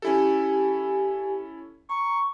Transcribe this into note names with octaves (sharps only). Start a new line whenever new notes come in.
C#4 E4 G4 A4 G#5
A#5 C#6